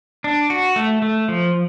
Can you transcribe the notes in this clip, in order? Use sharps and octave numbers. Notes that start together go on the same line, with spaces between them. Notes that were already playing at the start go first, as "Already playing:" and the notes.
D4
F#4
A3
A3
F3